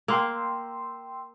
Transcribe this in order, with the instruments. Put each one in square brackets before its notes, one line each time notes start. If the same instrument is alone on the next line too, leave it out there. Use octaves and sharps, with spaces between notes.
[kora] A#3 [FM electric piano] G5 C6 E6